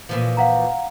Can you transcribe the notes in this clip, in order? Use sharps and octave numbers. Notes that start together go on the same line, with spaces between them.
A#2 E3 F3
F5 F#5 A#5